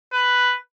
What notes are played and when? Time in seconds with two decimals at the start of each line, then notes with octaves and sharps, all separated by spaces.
0.13 B4